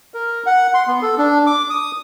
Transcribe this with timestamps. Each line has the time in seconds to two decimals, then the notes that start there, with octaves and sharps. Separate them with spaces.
0.14 A#4
0.46 F#5
0.74 C6
0.87 B3
1.02 A4
1.18 D4
1.46 D6
1.70 D#6